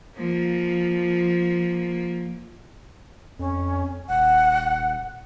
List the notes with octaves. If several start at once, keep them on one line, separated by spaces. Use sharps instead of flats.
F3 A#3
F2 C#4
D#1 F#5